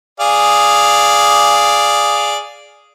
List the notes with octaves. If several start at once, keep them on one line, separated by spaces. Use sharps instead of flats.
G#4 D5 F5